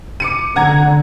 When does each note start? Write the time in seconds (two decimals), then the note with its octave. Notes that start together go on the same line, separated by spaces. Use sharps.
0.20 D6 C#7 D#7
0.56 F1 D3 F#5 A#5 G#6